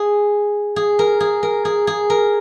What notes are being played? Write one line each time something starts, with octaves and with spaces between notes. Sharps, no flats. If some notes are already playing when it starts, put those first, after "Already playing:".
Already playing: G#4
G#4
A#4
G#4
A#4
G#4
G#4
A#4